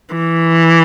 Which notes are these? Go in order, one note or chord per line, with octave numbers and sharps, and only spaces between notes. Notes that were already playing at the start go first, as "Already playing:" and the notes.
E3